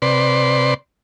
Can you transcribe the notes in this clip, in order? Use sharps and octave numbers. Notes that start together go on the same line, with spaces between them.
C3 B4 D5 C6